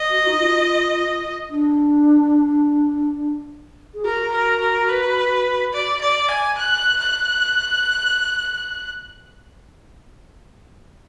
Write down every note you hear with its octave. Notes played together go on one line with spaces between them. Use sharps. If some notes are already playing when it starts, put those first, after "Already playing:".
Already playing: D#5
F#4
D#4
F4
D4
G#4
F#4 A#4
A#4
A#4
B4
D5
D5
G#5
F#6
F#6